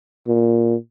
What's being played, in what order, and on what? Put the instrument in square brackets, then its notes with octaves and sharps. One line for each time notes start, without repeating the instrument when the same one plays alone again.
[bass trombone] A#2